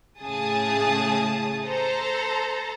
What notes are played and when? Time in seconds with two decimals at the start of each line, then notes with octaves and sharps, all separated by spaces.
0.21 A2 C#3 G#4 A5 D#6
1.65 A4 C5 A#5